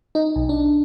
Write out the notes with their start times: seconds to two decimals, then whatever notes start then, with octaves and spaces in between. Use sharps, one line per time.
0.15 D#4
0.36 B1
0.49 D4